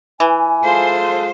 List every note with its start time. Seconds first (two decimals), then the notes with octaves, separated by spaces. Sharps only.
0.20 E3 G#5
0.63 G#3 F4 A4 C5